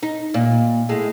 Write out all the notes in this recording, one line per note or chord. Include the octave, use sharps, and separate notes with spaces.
D#4
A#2
A2 G#3